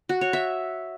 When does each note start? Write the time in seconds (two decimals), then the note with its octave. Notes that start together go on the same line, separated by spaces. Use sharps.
0.09 F#4
0.21 C#5
0.33 E5